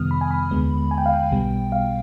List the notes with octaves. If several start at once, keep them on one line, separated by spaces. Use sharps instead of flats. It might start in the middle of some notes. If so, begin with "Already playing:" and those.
Already playing: F2 C3 D#3 G3 B3 D#6 F6
B5
G#5
B5
D#2 D3 G#3 B3
G#5
G5
F5
G5
B1 B2 G3 B3
F5